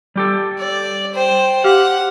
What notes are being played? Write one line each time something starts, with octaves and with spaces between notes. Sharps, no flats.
G3 G4 A4
D5
C5 G5
G4 F5 F#5